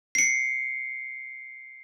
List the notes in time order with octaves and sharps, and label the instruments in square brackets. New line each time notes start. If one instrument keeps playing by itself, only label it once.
[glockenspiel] C7 C#7